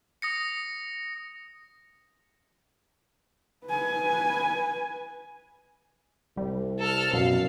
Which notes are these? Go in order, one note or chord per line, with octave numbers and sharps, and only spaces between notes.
D#6 A#6 C#7
B4 G#5
C2 G3
A4 F6
F#2 B2 F5